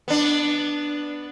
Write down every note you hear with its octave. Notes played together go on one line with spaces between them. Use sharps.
B3 D4